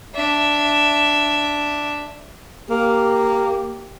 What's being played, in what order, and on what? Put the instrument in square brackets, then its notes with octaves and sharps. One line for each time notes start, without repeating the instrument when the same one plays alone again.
[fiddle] D4 E5
[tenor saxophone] A#3 [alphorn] G4